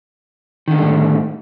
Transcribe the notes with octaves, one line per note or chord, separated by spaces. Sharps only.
A2 D3 D#3 G3 A#3